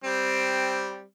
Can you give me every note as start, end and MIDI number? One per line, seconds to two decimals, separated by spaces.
0.04 1.03 55
0.04 1.03 60